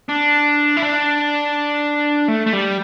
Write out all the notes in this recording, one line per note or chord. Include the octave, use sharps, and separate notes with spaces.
D4
E4
D4
A3
A3
G3